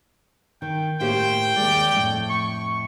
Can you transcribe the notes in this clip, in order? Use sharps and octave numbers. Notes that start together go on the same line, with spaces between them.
D#3 G5
A2 A#3 G4 C5 G5
D#2 G#3 D5
F2 A2
C#6